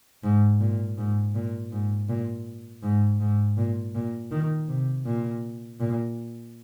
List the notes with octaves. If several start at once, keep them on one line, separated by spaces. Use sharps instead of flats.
G#2
A#2
G#2
A#2
G#2
A#2
G#2
G#2
A#2
A#2
D#3
C3
A#2
A#2